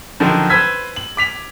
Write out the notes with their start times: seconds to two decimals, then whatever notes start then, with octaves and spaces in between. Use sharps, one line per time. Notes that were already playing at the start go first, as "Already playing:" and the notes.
0.20 D3 D#3 F3 F#3
0.50 B4 C5 E6 G#6 B6
0.96 F#7
1.17 D6 B6 F7